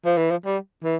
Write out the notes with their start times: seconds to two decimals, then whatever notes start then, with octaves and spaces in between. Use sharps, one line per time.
0.05 F3
0.18 E3
0.31 F3
0.45 G3
0.84 E3